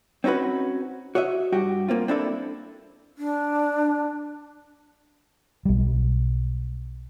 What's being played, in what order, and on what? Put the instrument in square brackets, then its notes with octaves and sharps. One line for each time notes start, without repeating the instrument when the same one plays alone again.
[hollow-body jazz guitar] C4 C#4 D#4 F#4 B4
F#4 C#5 D#5 E5
G2 F#4 G4
A#3 C4 F4
C4 D4 E4 A4
[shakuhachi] D4
[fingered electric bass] B1 G3